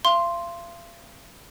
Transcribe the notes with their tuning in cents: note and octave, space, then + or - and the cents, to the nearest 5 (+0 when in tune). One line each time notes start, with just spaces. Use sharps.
F5 -40 C6 +0